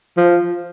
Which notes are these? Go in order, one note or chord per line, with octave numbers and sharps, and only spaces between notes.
F3